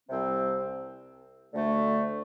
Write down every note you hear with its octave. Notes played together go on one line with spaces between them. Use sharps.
C2 C3 G3 C4
D2 D3 A3